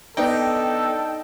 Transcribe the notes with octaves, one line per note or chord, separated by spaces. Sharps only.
B3 D4 D#4 A4 G5